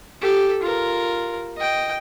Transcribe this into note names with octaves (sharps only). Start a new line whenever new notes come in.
G4 A4
F4 A#4
D#5 G5